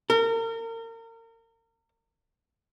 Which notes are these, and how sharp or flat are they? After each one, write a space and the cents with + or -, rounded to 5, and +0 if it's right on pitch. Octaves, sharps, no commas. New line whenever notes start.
A#4 -35